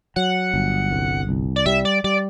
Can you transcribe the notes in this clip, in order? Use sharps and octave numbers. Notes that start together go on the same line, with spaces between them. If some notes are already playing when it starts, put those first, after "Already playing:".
F#3 F#5
G1
C2
C2
D5
G3 E5
D5
G3 D5